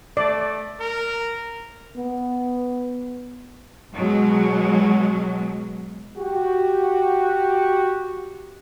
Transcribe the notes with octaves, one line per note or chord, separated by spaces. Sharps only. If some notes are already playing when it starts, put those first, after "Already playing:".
A3 D5
A#4
B3
B2 F#3 G#3
F#4 G4